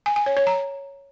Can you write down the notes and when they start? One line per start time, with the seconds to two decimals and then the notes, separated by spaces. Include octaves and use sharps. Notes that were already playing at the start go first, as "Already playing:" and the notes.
0.06 G#5
0.16 G#5
0.26 C#5
0.37 C#5
0.47 A#5